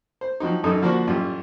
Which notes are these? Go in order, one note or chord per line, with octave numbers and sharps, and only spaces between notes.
C5
F3 F#3 C4 D#4
A1 F#2 D#4 A4 D#6
D3 F3 A#3 D4 F#4
A1 F#2 G3 F4